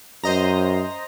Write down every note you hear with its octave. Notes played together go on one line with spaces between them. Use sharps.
F#2 C5 D#5 A#5